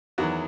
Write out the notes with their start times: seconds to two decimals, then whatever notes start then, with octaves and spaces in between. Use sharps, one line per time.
0.18 E2 D#3 F#3 F#4